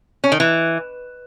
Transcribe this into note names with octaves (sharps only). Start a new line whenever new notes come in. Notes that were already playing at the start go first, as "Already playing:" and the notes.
C#4
D#3
E3